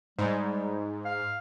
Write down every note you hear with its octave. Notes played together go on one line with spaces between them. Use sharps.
G#2 G3
F5